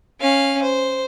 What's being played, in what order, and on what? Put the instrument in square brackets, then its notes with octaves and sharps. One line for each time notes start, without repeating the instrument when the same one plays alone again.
[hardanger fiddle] C#4 F5
C5